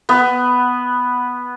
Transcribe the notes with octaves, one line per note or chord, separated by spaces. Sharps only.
B3